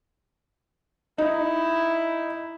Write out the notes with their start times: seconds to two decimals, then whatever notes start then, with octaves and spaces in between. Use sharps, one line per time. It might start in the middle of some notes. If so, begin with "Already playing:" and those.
1.18 D#4 E4